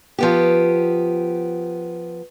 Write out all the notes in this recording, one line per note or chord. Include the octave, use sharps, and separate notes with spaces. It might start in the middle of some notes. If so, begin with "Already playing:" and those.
F3 B3 G4